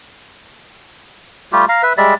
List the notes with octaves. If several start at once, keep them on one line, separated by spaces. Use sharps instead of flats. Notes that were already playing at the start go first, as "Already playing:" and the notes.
G3 A3 F4 G4
F5 A#5
B4 E5
G3 G#3 D5 E5